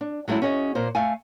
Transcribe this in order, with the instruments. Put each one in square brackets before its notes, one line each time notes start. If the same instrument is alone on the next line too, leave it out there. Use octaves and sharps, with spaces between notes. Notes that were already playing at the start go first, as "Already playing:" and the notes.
[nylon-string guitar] D4
F#3 G#3 A3 C#4 E4
C#4 F#4 G#4 D#5
A#2 A#3 C5
A3 F5 G#5